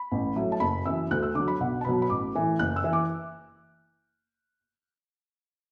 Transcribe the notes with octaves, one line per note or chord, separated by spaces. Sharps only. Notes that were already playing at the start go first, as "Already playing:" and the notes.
Already playing: B5
A1
A2 F#3
A5
F#1 B5
F#2 E3 E6
D2 F#6
E6
D3 F#3 D6
B5
B1 F#5
A5
B2 F#3 B5
B5
A1 D6
A2 E3
F#1 F#6
E6
E3
D6